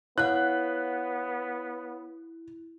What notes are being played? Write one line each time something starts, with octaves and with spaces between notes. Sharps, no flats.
B3 E4 C#5 F5 F#5 F#6